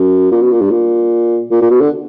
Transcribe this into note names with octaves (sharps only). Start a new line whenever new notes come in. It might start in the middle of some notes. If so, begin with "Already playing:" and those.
Already playing: F#2
A#2
B2
A#2
G2
A#2
A#2
A#2
B2
D3